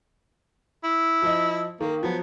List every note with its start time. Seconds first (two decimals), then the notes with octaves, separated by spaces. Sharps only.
0.84 E4
1.22 F3 D#5
1.81 D#3 A#3
2.03 F3 F#3 B3